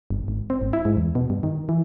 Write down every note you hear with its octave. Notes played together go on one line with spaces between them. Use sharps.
G1
G#1
C4
G#1
E4
G#2
E2
B2
G2
D#3
E3